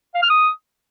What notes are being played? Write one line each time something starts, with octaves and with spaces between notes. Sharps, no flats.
F5
F6
D#6